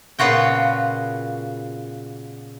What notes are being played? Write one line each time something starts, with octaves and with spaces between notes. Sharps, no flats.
A#2 C#3 B3 F4 F#4 G5